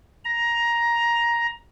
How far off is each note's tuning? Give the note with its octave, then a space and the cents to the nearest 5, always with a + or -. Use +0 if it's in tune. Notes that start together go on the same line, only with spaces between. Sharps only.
A#5 +10